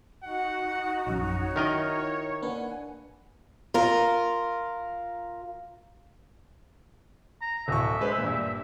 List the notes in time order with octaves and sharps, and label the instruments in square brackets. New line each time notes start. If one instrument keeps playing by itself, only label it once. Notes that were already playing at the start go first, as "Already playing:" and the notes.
[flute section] D#4 F#4 [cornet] F#5
[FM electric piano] A#1 F#2 [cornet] C#5
[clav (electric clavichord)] D#3 A#4 D#5 [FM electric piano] E4
[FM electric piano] A#3 D4 B4 [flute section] F#5 G#5
[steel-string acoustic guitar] F4 A#4
[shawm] A#5
[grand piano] D1 C#6 [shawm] E5
[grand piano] G#3 B4 C5
G2 A#2